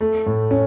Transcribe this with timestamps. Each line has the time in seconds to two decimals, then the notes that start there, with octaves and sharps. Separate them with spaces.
0.01 A3
0.26 A2
0.51 C#4